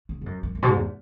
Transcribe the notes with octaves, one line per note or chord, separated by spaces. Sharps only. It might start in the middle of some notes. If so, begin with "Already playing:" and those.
C#3
G#2
F#2
F#2
F#2
B2
G#2
E2